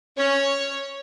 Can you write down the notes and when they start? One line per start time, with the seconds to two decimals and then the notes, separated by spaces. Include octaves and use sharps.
0.17 C#4 C#5